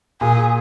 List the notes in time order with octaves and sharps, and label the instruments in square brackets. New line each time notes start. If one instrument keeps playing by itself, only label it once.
[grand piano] A#2 [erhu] G#4